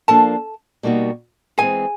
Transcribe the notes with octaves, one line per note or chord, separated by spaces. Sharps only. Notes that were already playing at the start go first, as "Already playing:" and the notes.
F3 A#3 D4 A4 A5
B2 G3 A#3 D#4 F#4
E3 G#3 C4 G#4 G#5